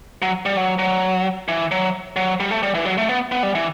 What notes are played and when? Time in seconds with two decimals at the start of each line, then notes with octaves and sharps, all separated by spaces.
0.22 F#3
0.46 G3
0.57 F#3
0.79 F#3
1.48 E3
1.71 F#3
2.16 F#3
2.40 G3
2.51 A3
2.63 G3
2.75 E3
2.85 F#3
2.98 A3
3.09 B3
3.32 B3
3.43 G3
3.55 E3